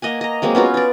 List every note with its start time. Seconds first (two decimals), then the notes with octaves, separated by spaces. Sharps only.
0.02 A#3 D#5 F#5 G#5
0.21 D#5 A#5
0.42 F#3 G#3 A#3 C4
0.55 B3 C#4 F4 F#4
0.74 F4 D5